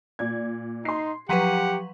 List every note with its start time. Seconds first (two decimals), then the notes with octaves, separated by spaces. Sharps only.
0.19 A#2 D5 G#6
0.85 D#4 C6 C7
1.29 F3 F#3 G4 B4 F#5 A#5 B6 D#7